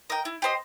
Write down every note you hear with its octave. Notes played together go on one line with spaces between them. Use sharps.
A#4 D#5 G5
E4
G4 C5 D#5